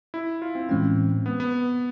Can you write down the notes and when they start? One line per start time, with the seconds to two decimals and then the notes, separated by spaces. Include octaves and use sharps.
0.14 E4
0.42 F4
0.55 C4
0.69 A2 E3 G#3 C4 C#4
1.26 B3
1.40 B3